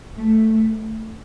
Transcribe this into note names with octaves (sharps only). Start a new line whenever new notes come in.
A3